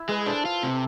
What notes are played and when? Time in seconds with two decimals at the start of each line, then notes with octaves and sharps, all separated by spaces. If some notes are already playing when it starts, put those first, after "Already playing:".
Already playing: E4 E5
0.08 G#3 G#4 B4
0.26 D4 A4 C5
0.45 F4
0.63 C3